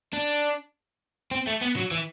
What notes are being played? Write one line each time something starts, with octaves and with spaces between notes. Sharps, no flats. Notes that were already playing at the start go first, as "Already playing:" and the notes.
D4
C4
A3
B3
F#3
E3